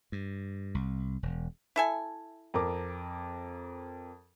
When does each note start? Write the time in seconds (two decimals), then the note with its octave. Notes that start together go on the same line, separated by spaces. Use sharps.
0.12 G2
0.75 C2
1.23 E1
1.76 E4 A4 G#5
2.54 F2 A#4 D6